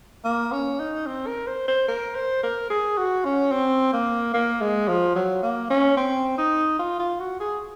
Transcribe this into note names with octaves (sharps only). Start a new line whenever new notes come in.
A#3
C#4
D#4
C4
A#4
C5
C5
A#4
C5
A#4
G#4
F#4
C#4
C4
A#3
A#3
G#3
F3
F#3
A#3
C#4
C4
D#4
F4
F4
F#4
G#4